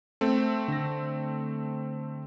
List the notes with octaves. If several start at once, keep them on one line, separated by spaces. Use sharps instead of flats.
A3 C4
D3 A#6